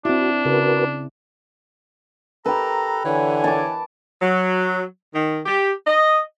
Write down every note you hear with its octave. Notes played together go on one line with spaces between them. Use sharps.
C4 D4 E4 F#4
C#3 F#4 A#4 B4
G4 A4 B4 A#5
D3 E3 C#5 G#5
A5 D6
F#3
D#3
G4
D#5